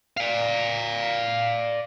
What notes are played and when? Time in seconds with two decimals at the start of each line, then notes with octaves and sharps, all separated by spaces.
0.17 D5 F5